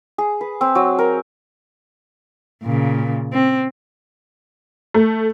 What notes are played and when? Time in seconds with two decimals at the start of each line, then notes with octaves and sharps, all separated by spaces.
0.18 G#4
0.41 B4
0.61 C4
0.75 F#3
0.99 A#4
2.64 A#2 C#3
3.32 C4
4.94 A3